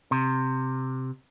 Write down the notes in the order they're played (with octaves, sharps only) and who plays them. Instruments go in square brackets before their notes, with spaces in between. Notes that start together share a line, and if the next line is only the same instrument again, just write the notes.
[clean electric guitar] C3